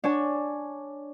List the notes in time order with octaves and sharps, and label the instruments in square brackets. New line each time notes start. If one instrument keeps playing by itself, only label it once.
[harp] D4 C#5 G#5